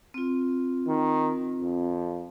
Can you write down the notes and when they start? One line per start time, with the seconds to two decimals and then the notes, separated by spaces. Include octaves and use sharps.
0.14 C4 F4
0.88 D#3
1.59 F2